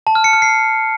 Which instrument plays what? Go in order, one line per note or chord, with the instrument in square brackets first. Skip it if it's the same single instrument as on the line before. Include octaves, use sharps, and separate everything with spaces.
[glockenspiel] A5
F6
C#7
F6
C7